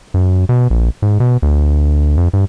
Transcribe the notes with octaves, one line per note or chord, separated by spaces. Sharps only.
F#2
B2
A#1
G#2
B2
D2
F2
G2